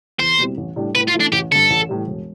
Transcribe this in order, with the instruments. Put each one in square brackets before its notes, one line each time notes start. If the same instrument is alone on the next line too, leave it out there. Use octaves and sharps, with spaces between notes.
[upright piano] E2 [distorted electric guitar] C5
[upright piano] B2 G3 C4 E4
A1
A2 G3 D4
[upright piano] A2 [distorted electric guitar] B4
[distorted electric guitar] F4
[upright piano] E3 A3 E4
[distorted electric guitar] D4
[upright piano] A1 [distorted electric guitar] G4
[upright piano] G2 D3 [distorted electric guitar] A4
[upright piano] A1
A2 E3 G3
E1